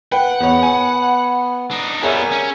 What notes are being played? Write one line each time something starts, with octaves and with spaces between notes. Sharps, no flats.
B4 F#5 G5
E2 B3 C#5
G#5
D4 D#4
G3 B3 G#4 A#4 C#5 E5 G#5
C#4